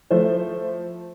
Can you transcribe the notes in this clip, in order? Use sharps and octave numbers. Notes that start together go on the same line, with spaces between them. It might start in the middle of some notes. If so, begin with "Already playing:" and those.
F3 A3 E4 C5